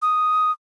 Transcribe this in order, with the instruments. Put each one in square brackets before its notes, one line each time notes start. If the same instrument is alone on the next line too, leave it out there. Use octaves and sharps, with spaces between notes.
[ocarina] D#6